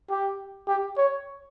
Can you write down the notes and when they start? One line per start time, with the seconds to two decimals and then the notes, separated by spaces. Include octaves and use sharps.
0.10 G4
0.68 G4
0.97 C#5